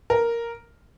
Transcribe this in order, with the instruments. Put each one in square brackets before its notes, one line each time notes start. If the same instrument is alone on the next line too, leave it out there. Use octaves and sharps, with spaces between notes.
[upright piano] A#4